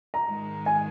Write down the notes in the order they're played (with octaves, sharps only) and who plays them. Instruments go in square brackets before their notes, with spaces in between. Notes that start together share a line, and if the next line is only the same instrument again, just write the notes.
[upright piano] A#5
[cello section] G#2 D#3 G#3
[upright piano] G#5